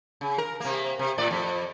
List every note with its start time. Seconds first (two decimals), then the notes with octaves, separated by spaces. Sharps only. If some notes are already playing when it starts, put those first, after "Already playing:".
0.21 C#3
0.38 A#4
0.60 C3 A#3
0.99 C3
1.18 A2 D5
1.31 F2